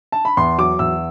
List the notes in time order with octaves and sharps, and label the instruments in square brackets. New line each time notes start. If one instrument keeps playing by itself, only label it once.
[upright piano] A5
B5
E2 C6
F#3 D6
E2 E6